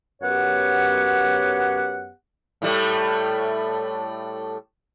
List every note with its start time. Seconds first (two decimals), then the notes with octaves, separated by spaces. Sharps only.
0.22 F#2 B3 G4 C#5 F#5
2.62 A2 G3 A3